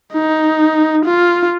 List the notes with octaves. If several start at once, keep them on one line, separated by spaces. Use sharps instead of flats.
D#4
F4